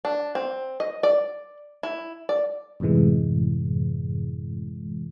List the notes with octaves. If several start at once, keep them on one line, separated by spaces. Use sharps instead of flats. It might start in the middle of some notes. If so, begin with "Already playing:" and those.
D4
C4
D#5
D5
E4
D5
F#2 A2 C3 E3 G#3